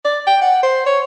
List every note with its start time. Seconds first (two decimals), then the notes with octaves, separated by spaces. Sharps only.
0.05 D5
0.27 G5
0.41 F#5
0.63 C5
0.86 C#5